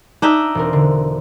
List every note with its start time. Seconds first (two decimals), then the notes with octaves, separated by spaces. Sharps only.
0.22 D4 D#4 E5
0.55 E1 C4 A#4
0.73 D3